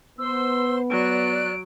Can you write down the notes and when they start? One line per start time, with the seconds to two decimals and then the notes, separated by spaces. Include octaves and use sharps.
0.18 B3 C5 C6 E6
0.90 F#3 D5 F#6 D7